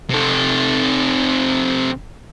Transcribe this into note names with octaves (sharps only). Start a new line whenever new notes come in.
C3 A4